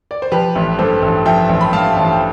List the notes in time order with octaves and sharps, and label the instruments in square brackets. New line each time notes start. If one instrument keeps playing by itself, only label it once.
[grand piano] D5
C5
F3 G4 B4
A1
G2 A4 C5
A1
F3 E5 G5
A1
B5
G2 F5 A5
A1
G5